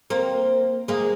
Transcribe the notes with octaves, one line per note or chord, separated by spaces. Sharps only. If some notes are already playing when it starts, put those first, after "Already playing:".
A#3 C4
G#3 A#3